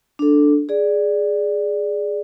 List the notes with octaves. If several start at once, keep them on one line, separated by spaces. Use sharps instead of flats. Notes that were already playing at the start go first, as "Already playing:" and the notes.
D4 A4
G#4 D5